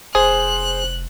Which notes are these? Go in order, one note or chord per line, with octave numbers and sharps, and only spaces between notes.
F1 G#4 C5 F#6